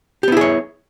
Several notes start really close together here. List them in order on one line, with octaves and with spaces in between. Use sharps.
G4 B3 E4 G#4 C#5